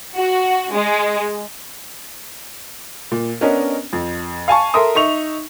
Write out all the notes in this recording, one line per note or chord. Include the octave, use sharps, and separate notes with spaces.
F#4
G#3
A#2
B3 C#4 D4 A#4 D#5
F2
F5 G#5 A5 C#6
A4 A#4 E5 C6 D#6
D#4 E5 C#6 F7